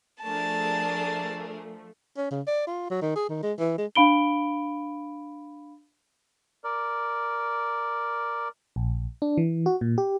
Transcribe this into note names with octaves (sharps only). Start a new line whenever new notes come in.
F3 A3 D4 G#4 A#4 A5
C#4
C#3
D5
F4
F#3
D#3
G#4
D#3
G#3
E3
G#3
D4 F5 B5 D7 G7
A#4 D5
A#1
D4
E3
F#4
A#2
G4